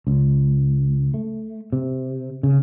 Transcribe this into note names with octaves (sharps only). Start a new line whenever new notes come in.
C#2
A3
C3
C#3